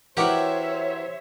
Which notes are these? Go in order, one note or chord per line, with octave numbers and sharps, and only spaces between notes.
E3 F#4 G4 A#4 C5 C#5 E5 F#5